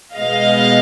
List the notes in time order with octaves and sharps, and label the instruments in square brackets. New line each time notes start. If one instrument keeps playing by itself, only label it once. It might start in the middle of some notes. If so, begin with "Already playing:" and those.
[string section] B2 G#3 B3 D#5 F5